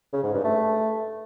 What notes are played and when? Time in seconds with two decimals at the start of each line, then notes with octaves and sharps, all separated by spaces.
0.13 C#3
0.23 G#2
0.34 G2
0.44 A3